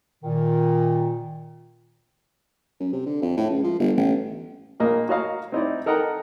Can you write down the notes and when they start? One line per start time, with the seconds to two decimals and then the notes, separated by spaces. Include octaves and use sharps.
0.23 A#2 D#3
2.80 F#2
2.93 C3
3.06 D3
3.22 F2
3.37 A2
3.50 C#2
3.64 F3
3.79 G1
3.97 A1
4.80 A#1 A#3 D#5
5.09 F#4 C#5 D#5 F5 A#5
5.52 C4 D#4 E4 D5
5.86 A4 A#4 D#5 F#5 G5 A#5